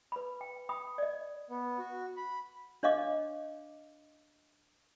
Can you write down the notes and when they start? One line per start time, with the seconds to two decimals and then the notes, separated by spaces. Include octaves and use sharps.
0.12 B4 B5
0.41 G5
0.69 G5 B5 D#6
0.98 D5 D#5
1.50 B3
1.79 F#4
2.17 B5
2.83 D4 C#5 D#5 F5 D6